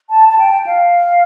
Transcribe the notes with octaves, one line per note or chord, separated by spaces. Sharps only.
A5
A5
G5
F5